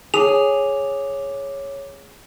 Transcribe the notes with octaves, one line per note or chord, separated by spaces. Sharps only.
G#4 C#5 D6 F7